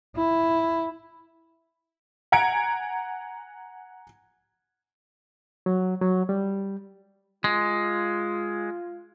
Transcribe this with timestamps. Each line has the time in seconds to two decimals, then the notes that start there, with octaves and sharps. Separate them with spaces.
0.16 E4
2.32 F#5 G#5 A#5 G#6 C#7 D7
5.66 F#3
6.01 F#3
6.29 G3
7.44 G#3 F4